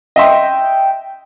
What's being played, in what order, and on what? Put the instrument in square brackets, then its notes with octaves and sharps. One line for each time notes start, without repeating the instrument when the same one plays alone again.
[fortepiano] D#5 E5 C6 [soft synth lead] G5